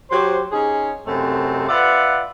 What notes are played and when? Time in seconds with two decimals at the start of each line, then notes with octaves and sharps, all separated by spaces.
0.10 F#3 G4 C5
0.52 C#4 D#4 G#4
1.06 F#2 C3 A3 C4 D#4
1.69 F4 B4 D5 E5 F#5